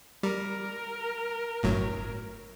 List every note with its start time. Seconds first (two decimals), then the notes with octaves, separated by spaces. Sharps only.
0.23 G3 A#4
1.63 G1 A2 F#3